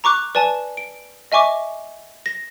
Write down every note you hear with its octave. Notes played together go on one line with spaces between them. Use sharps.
A#5 C#6 D6 F#6
B4 D5 G#5 A5
D7
D#5 E5 G#5 C#6 D6
A#6